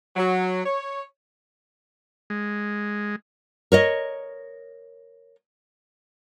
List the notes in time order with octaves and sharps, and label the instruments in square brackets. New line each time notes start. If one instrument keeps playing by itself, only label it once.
[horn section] F#3
C#5
[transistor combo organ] G#3
[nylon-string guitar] A#4 C#5 D#5